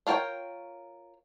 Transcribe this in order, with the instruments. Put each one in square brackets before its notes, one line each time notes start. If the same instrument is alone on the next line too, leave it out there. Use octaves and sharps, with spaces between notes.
[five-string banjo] D4 F4 A#4 C#5 G5